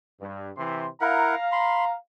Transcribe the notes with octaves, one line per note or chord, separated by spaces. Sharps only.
G2
C3 E3 C6
E4 A#4 F5 F#5 A#5
B5 C6